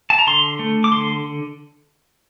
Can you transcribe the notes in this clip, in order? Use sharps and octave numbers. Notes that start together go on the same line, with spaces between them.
A5
A#5
D3 C6
A3
D6
D3 C6